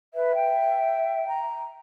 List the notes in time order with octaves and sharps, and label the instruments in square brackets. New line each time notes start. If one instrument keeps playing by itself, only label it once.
[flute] B4 [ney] E5
[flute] G5
[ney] A#5